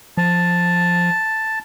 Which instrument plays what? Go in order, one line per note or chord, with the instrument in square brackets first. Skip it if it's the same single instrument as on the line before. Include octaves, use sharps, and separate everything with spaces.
[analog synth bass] F3 [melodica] A5